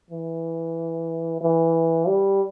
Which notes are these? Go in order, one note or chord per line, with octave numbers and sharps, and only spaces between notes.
E3
E3
G3